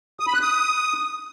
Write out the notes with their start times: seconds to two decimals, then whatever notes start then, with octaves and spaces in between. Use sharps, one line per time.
0.20 D#6
0.27 B5
0.34 F#6
0.41 D#6